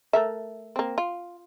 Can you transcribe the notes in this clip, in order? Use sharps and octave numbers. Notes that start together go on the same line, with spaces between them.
A3 A#4 E5
A#3 C4
F4